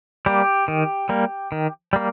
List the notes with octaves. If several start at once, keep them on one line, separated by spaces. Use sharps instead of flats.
G3 A#3 G4
D#3
G3 A#3
D#3
G3 A#3